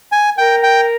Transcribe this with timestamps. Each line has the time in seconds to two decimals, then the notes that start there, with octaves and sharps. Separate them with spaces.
0.12 G#5
0.38 A#4 G5
0.63 G5